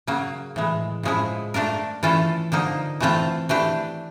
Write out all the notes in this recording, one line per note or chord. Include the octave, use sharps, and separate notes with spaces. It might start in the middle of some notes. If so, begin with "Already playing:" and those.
C#3 F#3 A#3
A2 E3 G#3
A2 F3 G#3 C#4 E4
A3 D4 F4 A#4
E3 A3 C#4 F4 A4
D3 F3 A#3 D#4
E3 A3 C4 F4
E3 A3 D4 G4